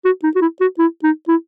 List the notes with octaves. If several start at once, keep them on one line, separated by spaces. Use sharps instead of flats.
F#4
D#4
F#4
E4
F#4
E4
D#4
E4